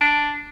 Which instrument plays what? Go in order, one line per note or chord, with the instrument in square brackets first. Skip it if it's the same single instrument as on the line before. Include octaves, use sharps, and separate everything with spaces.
[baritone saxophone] D4